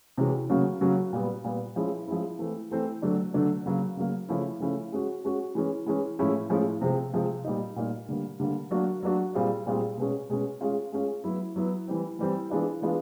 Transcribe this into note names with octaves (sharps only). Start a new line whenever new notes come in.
C3 E3 G#3 C#4 F#4
C#3 F#3 A#3 C#4 F#4
C#3 F#3 A#3 C#4 F#4
A#2 G3 B3
A#2 G3 B3
F3 G#3 C#4 E4
F3 G#3 C#4 E4
E3 A3 C4
E3 A3 C4
D3 F#3 A3 D4
D3 F#3 A3 D4
C#3 F#3 A#3
C#3 F#3 A#3
C#3 F3 A3 C#4 E4
C#3 F3 A3 C#4 E4
G#3 C#4 F#4
G#3 C#4 F#4
E3 G#3 C#4
E3 G#3 C#4
A2 F3 G#3 C#4 E4
A2 F3 G#3 C#4 E4
C3 F3 G#3 C4
C3 F3 G#3 C4
A#2 G3 A#3 D#4
A#2 G3 A#3 D#4
D3 G3 A#3
D3 G3 A#3
F#3 A#3 D4 F#4
F#3 A#3 D4 F#4
A#2 G3 C4 F4 G#4
A#2 G3 C4 F4 G#4
B2 G#3 C#4
B2 G#3 C#4
G#3 C#4 F4 G#4
G#3 C#4 F4 G#4
F#3 B3 E4
F#3 B3 E4
E3 G3 C4
E3 G3 C4
E3 G#3 B3 D4 F4
E3 G#3 B3 D4 F4